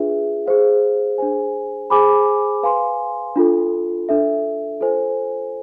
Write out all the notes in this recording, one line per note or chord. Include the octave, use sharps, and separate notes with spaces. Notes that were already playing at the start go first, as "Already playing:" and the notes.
Already playing: D4 F4 G#4 B4 E5
G#4 C5 F5
D4 G#4 C5 G#5
G#4 C5 G#5 B5 D6
B4 F5 G#5 C6
D4 F4 A4
D4 A4 E5
F4 A4 C5 G#5